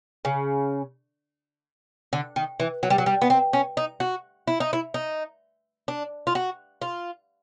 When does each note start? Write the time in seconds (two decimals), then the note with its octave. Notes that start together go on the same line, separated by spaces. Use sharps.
0.25 C#3
2.13 D3
2.36 D#3
2.60 E3
2.83 F#3
2.90 G3
2.98 F#3
3.06 G3
3.21 B3
3.30 C4
3.53 C#4
3.77 D#4
4.00 F#4
4.47 E4
4.60 D#4
4.73 E4
4.94 D#4
5.88 D4
6.27 F4
6.35 F#4
6.82 F4